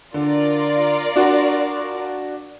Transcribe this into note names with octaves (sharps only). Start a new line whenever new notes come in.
D3 F4 A#4 D5
D4 F#4